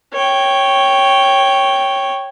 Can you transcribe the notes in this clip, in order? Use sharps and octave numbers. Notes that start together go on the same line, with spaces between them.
C#5 G5